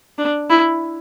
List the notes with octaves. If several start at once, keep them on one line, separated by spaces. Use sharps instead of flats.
D4
E4